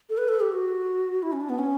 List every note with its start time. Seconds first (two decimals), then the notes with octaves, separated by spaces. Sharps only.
0.09 A4
0.18 B4
0.28 A4
0.41 G4
0.52 F#4
1.23 E4
1.32 C#4
1.41 D4
1.49 B3
1.59 C#4